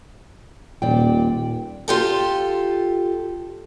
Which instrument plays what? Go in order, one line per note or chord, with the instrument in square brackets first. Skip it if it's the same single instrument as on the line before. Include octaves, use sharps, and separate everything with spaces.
[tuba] D#1 [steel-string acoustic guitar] A#2 D5 G5
[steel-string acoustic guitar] F4 G4 A4